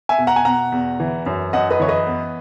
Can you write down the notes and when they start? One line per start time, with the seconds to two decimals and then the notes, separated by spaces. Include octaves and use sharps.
0.09 E5 G#5
0.18 B2
0.27 F#5 A#5
0.36 G#5
0.45 B2 F#5 A#5
0.72 E2
1.00 E3
1.26 F#2
1.53 F#2 D#5 F#5
1.71 B4 D#5
1.80 E3 C#5
1.88 B4 D#5
2.06 B3